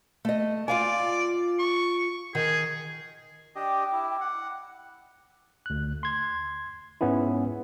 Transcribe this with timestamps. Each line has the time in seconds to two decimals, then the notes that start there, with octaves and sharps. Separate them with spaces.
0.25 A3 D#5
0.68 F4 D5 F5 G#5
1.59 C#6
2.35 D#3 G#4
3.55 D4 G4 D#5 G5 D6
3.93 E4
4.21 F#5
5.66 D2 F#6
6.03 C6 G#6
7.01 G#2 G#3 B3 C#4 E4